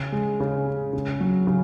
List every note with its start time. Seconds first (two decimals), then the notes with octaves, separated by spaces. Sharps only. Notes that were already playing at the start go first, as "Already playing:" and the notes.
Already playing: C#3
0.12 G#3
0.40 C#3
0.67 C#4
0.93 C#3
1.20 F#3
1.47 C#3